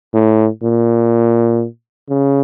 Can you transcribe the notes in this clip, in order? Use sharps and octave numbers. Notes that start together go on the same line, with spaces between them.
A2
A#2
C#3